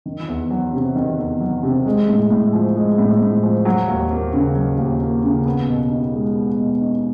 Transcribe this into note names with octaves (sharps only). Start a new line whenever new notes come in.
D#3
E2
F#3
C3
D#3
E2
F#3
C3
G#3
A2
A2
F3
G#3
A2
A2
F3
F#3
D#2
A#3
C#3
F#3
D#2
A#3
C#3
B3
B2
D#4
G#3
B3
B2
D#4